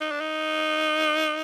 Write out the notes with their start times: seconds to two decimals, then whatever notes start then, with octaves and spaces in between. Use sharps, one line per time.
0.01 D#4
0.11 D4
0.21 D#4